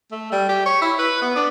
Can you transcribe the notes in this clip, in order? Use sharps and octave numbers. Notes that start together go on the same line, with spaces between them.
A3
G3
G4
C#5
E4
B4
B3
D4